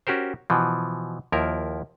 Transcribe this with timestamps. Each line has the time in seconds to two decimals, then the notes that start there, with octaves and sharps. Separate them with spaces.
0.07 C#4 F#4 G4 A#4 C5
0.50 B2 E3 F3
1.32 D#2 F3 E4 A#4